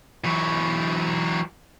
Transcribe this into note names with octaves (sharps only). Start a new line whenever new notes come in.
E3 F#3